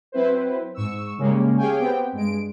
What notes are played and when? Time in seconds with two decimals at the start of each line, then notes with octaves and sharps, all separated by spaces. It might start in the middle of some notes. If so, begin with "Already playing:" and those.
0.12 F#3 C4 E4 B4 C5
0.74 G#2 C#6 E6
1.18 C#3 G3 G#3 A#3 C#4
1.57 G4 G#4 C#5 F5 G5 G#5
1.80 B3 C4 G4 G5
2.13 G2 G#3 D7